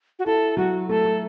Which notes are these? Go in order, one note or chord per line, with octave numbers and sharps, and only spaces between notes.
F#4
E4 A4
F#3 F#4
A3 A4
A3